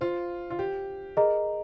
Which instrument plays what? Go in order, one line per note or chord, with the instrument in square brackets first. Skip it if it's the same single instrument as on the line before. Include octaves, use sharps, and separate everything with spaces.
[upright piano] F4 [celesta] C5 F5 C6
[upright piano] F4
G4
[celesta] G#4 D#5 A#5 [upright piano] A#4